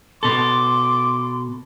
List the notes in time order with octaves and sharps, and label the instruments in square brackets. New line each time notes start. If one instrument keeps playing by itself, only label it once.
[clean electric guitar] B2 A4 [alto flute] C6 [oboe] D6